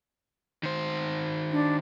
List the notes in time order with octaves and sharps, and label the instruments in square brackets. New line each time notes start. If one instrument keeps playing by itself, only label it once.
[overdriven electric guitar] D#3 C5
[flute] D4